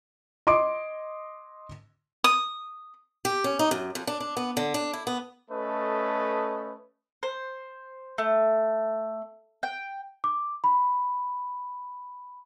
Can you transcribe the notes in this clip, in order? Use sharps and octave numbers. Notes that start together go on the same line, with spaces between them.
D#5 C6 D6 D7
D#6
G4
C#4
D#4
F#2
F2
D4
D4
B3
D3
D4
E4
B3
A3 C#4 A4 B4 D#5
C5
A3
G5
D6
B5